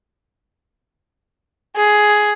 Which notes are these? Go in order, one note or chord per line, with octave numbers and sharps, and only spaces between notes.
G#4